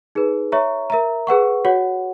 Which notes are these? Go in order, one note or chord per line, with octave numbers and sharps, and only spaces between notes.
D#4 G#4 B4
C#5 E5 A#5 C#6
A#4 E5 A#5
G#4 B4 F#5 C#6
F#4 C#5 F#5